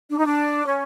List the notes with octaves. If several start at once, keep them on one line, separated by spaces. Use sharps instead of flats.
D4
D#4
D4
C#4